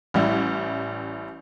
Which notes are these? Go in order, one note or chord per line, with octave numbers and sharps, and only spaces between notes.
A1 G3 E4